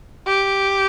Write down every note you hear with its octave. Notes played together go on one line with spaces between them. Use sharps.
G4